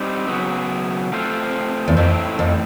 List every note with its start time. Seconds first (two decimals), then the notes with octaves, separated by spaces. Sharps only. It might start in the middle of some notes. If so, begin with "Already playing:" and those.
Already playing: G3 C4 D#4
0.28 C#3 F#3 B3
1.12 A3 C4 F4 A4 C5
1.88 E2
1.97 F2 A2 E3 A3 C4
2.39 F2